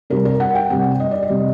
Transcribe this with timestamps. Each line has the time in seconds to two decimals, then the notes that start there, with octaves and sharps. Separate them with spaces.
0.10 C3 G3 C4 A#4
0.25 A#4
0.40 F#5
0.55 G5
0.70 C3 G3 C4 F#5
1.00 D#5
1.11 D5
1.23 D#5
1.29 C3 G3 C4